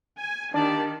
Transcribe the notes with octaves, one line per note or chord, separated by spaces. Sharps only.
G#5
D#3 A#3 D4 G4 D5 A5